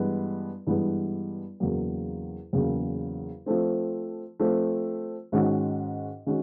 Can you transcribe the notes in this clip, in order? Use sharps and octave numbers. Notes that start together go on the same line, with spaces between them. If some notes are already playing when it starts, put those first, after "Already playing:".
Already playing: G2 E3 G#3 B3
G2 E3 G#3 B3
E2 C#3 F#3 A#3
E2 C#3 F#3 A#3
F3 A3 C4
F3 A3 C4
G#2 D#3 G#3 C#4 F#4
D#3 G#3 C#4 F#4